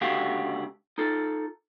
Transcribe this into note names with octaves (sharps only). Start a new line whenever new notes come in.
C#2 D3 D4 F#4 G4 F5
D#4 F4 A4